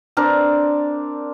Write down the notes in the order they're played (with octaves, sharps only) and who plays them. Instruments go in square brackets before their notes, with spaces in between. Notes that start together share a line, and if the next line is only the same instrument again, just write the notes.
[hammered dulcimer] C4 D4 A#4